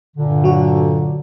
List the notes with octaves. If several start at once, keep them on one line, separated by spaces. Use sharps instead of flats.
G2 A#2 D3
F#3 F#4